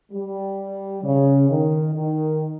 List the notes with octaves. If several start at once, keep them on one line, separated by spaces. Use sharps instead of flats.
G3
C#3
D#3
D#3